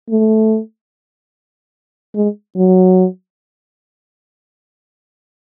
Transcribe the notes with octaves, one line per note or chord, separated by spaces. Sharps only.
A3
G#3
F#3